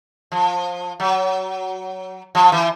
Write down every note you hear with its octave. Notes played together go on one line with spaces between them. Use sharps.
F3
F#3
F3
E3